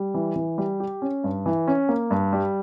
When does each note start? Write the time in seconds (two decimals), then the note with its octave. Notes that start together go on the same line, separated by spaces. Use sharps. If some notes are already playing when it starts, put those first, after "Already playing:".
Already playing: G3
0.14 E3
0.36 E3
0.58 G3
0.80 G4
1.02 C#4
1.24 G2
1.46 E3
1.68 C#4
1.89 A#3
2.11 G2
2.33 G3